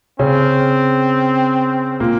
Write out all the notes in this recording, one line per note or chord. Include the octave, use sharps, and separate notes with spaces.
C#3 C4 C#4
A#2 A#3